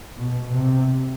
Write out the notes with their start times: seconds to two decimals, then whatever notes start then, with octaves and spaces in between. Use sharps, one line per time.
0.17 B2
0.53 C3